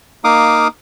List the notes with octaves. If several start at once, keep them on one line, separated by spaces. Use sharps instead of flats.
A#3 D#4 F5 D6 D#6